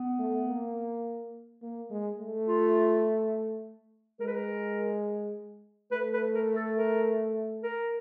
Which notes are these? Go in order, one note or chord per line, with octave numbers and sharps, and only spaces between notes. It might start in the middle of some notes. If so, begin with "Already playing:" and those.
Already playing: B3
A3
A#3
A#3
G#3
A3
F4
G#3 A#4
B4
A#4
A3 B4
B4
A#4
A4
A#4
A#4